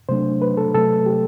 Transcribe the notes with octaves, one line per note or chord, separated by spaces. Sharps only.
C3 F#3 A3 D4 C5
B4
A4
C3 F#3 A3 A4
G4